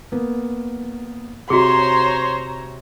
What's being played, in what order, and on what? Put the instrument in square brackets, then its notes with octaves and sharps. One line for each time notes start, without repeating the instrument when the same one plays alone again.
[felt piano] A#3 B3
[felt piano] C3 [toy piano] F#4 G#4 [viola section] C5 C#5 A#5 [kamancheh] C6